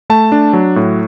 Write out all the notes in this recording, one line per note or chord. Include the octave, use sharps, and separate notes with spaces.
A3 A5
D4
F#3
A2